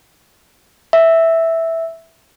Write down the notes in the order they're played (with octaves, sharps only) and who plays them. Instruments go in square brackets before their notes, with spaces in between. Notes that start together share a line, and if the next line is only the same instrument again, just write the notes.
[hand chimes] E5